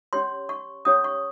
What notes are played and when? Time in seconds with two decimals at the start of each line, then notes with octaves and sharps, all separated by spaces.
0.13 C#4 G4 C#5 C6
0.49 C#6
0.85 C#4 G4 C#5 D#6
1.04 C#6